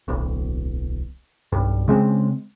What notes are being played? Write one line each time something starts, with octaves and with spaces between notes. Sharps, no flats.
D1 B1
B1 G2
C#3 G#3 A#3 C4